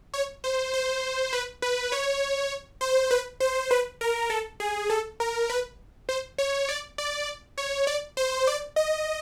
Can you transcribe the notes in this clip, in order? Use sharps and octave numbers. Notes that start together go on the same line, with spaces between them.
C#5
C5
C5
B4
B4
C#5
C5
B4
C5
B4
A#4
A4
G#4
A4
A#4
B4
C5
C#5
D5
D5
C#5
D5
C5
D5
D#5